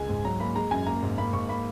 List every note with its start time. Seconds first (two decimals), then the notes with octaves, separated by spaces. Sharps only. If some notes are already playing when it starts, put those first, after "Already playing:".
Already playing: C#2 G#3 G#5
0.09 G#2
0.25 F#3 A#5
0.40 A#3 B5
0.56 G#3 A#5
0.71 F#2 G#5
0.86 A#3 A#5
1.02 G#2
1.18 A#3 B5
1.33 G#2 C#6
1.49 A#3 B5